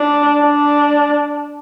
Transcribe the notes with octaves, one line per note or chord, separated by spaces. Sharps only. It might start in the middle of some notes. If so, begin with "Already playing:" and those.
Already playing: D4
D4